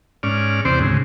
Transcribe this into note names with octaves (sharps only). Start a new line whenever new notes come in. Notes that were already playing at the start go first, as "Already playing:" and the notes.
G#2 C#4 D5 F6
E2 C3 C4 C5 D5
D2 G#2 C#3